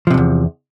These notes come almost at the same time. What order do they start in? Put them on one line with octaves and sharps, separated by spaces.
F3 C3 G2 E2